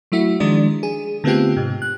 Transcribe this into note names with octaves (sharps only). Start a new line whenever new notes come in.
F#3 A3 E4 F#4
D#3 F3 G#3 D4 D5
G#4
D3 A3 B3 C4 F4 G4
G#2 C3
F#6